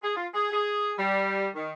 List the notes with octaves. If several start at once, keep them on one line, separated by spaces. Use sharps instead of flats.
G#4
F4
G#4
G#4
G3
D#3